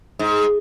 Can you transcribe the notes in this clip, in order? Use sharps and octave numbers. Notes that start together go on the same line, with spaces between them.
G#2